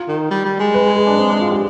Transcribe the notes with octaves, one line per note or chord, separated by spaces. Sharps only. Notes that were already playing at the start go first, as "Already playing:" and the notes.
Already playing: F4
D#3
G3
G3
G#3
B4
G#4
G#4
D4
C4
D4
F4
G4